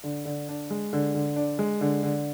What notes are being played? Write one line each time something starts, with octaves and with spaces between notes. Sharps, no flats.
D3
D3
D4
G#3
D3
D3
D4
G#3
D3
D3